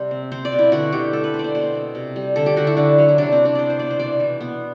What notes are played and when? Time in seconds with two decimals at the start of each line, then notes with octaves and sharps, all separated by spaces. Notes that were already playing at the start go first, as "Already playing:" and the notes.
Already playing: C3 G3 C5
0.11 C4
0.32 C4 C5
0.45 D5
0.52 B2
0.59 E4
0.72 D3 F#4
0.92 D3 G4
1.13 A3 A4
1.24 B4
1.34 B2 C5
1.39 D5
1.44 C5
1.55 B2 C5
1.75 C4
1.95 C3
2.16 G3
2.36 D3 A4
2.46 G4
2.56 D3 F#4
2.67 E4
2.77 D3 D4
2.98 F#3
3.08 E4
3.18 C3 D4
3.32 C4
3.39 C3
3.45 D4
3.55 B3 C5 D5
3.70 C5
3.79 B2 D5
3.90 C5
3.99 E3 D5
4.20 E3
4.41 B3